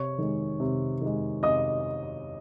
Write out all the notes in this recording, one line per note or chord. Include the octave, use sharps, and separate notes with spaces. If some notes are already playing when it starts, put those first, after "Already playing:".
Already playing: C3 C#5 C#6
D#3 G#3
C3
D#3 G#3
C3 D#5 D#6